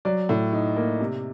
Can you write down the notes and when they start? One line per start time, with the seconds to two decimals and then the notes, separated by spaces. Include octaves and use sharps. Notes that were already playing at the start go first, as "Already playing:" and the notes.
0.05 F#3 D5
0.29 A2
0.53 D#4
0.76 A#3
1.01 C3